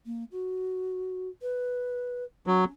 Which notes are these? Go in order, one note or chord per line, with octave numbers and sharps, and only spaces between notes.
A#3
F#4
B4
F#3 C#4